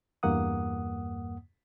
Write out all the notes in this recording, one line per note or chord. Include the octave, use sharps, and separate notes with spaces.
E2 G2 A#3 F#5 D#6